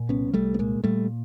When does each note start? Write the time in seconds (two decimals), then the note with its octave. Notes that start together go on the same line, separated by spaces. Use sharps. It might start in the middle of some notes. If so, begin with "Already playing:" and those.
Already playing: A#2
0.09 C2 B3 C#4
0.34 C2 G3 A3
0.54 B3
0.59 A#2 G#3 A#3
0.84 A#2 G3 A3